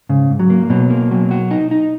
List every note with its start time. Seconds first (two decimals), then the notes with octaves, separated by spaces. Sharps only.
0.09 G#2 C#3
0.30 G#2
0.40 F#3
0.50 A#3
0.70 B2 F#3
0.90 A#3
1.11 F#3
1.31 F#4
1.51 D#4
1.71 D#4